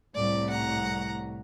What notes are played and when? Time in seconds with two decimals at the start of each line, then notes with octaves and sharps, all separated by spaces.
0.15 C2 A2 D5
0.50 F#5 A#5